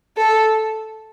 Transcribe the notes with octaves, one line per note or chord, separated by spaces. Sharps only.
A4